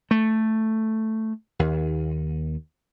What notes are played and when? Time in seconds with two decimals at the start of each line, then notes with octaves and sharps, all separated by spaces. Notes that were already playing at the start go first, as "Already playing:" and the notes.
0.11 A3
1.59 D#2